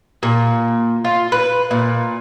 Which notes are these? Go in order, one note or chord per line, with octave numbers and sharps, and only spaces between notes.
A#2
F4
B4
A#2